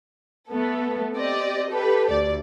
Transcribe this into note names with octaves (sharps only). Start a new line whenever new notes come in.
A3 B3 A4
C4 G4 D5 D#5
G4 A4 B4
D2 D5